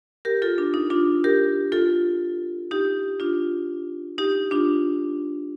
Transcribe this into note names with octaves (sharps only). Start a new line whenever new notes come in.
G4 A#4
F4 A4
D4
D#4
D4 F4
G4 A#4
F4 A4
D#4 G4
D4 F4
D#4 G4
D4 F4